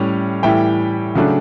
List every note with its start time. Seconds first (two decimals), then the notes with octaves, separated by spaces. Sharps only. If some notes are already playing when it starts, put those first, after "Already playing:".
Already playing: A2 G3 C#4
0.43 A2 E3 G3 E5 G5
1.15 C#3 F#3 A3 D4